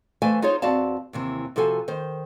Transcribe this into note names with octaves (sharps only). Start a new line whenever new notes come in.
E3 A3 C5 F5 G#5
D#4 F4 G#4 C5 C#5 F5
E2 C4 F#4 D5 F5 A5
D#2 C3 E3
C3 F3 F#4 A4 C#5 G#5
D#3 C5